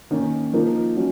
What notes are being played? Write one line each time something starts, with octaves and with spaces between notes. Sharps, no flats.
D#3 A#3 C#4
F3 A#3 D#4 A#4
F#3 C#4